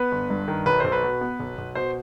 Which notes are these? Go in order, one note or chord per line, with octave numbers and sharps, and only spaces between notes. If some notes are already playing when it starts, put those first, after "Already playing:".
Already playing: B3 B4
G1
G2
D#3
B1 B4
B1 C5
B4
B2
B3
B1
B1
B2 C5